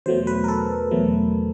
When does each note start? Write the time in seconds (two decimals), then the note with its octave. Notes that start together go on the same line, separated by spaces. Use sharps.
0.06 E2 B2 F#3 A3 C5
0.27 B4
0.44 A#4
0.48 A4
0.91 E2 B2 F#3 A3